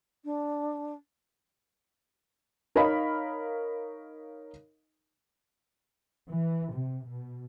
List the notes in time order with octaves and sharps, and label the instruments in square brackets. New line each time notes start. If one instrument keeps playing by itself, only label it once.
[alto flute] D4
[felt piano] D#4 A#4 C#5 D#5 F5 B5
[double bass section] E3
C3
B2